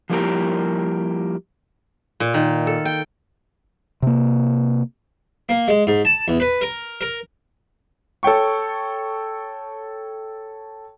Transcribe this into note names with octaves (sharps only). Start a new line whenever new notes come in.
F3 G3 A#3 E4 G4 A#4
A#2
D#3
A4
G5
C3 A#3
A#3
G#3
G#2
A5
E2
B4
A#4
A#4
A4 C#5 G5 C#6